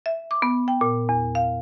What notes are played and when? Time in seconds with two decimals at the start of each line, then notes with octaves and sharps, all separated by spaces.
0.06 E5
0.31 D6
0.42 B3
0.68 G5
0.81 A#2
1.09 E2
1.35 F5